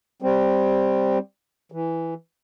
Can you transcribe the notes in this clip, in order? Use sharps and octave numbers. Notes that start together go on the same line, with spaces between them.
G3 C4
E3